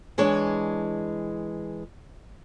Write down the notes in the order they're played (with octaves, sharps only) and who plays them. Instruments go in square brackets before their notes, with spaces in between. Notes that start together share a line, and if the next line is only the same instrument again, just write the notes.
[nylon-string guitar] E3 G#3 D4 C#5